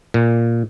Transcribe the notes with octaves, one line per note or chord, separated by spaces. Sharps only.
A#2